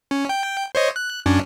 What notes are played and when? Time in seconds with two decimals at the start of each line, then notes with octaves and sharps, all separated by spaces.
0.11 C#4
0.29 G5
0.75 C5 C#5 D#5
0.96 F#6
1.26 F#2 C#4 D4